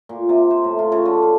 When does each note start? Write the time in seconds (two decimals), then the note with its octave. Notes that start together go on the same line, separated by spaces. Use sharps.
0.09 A#2
0.29 C3
0.51 C5
0.64 A2
0.79 F4
0.92 C#3
1.05 D3
1.22 F5